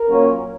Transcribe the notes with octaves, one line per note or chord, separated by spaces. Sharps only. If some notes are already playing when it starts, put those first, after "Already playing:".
Already playing: A#4
A#2 F#3 A#3 C#4